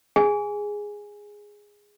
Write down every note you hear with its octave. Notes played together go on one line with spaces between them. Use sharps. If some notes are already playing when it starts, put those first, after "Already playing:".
G#4 G#5